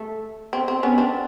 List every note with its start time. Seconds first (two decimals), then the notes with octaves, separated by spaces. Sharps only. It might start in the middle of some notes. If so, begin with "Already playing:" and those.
Already playing: A3
0.53 C4
0.68 C4
0.83 B3 C#4
0.98 C4 D4